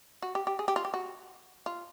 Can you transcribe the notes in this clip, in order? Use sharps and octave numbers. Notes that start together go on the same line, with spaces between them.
F#4
G4
G4
G#4
G4
F4
G4
F#4
F4